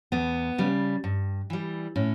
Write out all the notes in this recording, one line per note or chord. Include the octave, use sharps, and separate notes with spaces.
E2 B3
C#3 G3
G2
E3 G3
A2 C#4